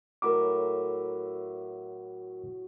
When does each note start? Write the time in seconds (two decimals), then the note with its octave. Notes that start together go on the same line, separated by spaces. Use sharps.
0.22 A2 F#3 A#4 E5 D6